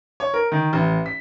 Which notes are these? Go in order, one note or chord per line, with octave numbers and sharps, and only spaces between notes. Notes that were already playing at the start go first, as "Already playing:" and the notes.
C#5
A#4
D#3
A1
B6